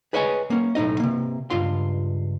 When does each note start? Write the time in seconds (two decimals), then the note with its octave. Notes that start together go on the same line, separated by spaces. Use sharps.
0.13 G#4 B4 C#5 D#5 G5 G#5
0.50 A#3 C#4
0.75 B1 A2 D#4 D#5
1.00 C3 A#3
1.50 C#2 G2 F4 C6